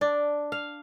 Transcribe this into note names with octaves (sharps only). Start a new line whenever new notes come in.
D4
F5